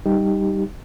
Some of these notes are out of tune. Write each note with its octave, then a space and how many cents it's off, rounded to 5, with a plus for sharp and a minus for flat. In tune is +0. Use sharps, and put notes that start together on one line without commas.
G3 -5 D#4 +0 G4 +0